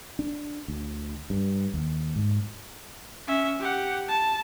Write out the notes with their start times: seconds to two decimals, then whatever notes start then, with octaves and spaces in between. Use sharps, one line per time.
0.19 D4
0.68 D2
1.30 G2
1.74 D#2
2.16 G#2
3.28 C#4 E5
3.60 G4 F#5
4.08 A5